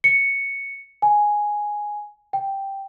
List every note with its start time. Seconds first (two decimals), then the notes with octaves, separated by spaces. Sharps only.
0.04 C#7
1.02 G#5
2.33 G5